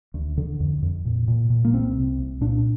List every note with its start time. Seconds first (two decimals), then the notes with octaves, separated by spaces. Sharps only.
0.14 D2
0.37 D3
0.60 F2
0.82 F2
1.05 A#2
1.28 A#2
1.50 A#2
1.65 A#3
1.74 C2 C4
1.95 C3
2.18 C2
2.41 A#2 D4